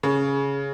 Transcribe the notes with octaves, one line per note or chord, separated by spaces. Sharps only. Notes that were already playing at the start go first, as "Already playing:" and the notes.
C#3